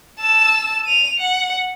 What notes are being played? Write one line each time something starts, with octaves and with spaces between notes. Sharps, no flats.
A5 E6
D#7 F7
F#5